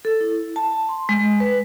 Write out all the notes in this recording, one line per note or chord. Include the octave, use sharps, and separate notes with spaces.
A4
E4
A5
C6
G#3
B4